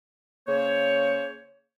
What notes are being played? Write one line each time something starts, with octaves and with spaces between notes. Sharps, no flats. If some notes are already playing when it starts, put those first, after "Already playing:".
C#3 A#3 C5 C#5